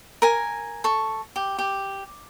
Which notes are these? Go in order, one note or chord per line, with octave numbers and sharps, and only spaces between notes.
A#4 G#5
A4 C#6
G4
G4